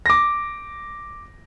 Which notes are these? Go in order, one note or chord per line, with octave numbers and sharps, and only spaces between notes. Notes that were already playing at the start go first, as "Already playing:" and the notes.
D6 A#6